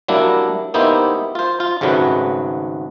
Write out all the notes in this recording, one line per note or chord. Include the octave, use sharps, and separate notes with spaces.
F#3 G3 A#3 D4 E4
A#3 B3 D#4 E4 G4 C5
F4 C5
F4
G#1 G#2 C#3 F#3 A3 B4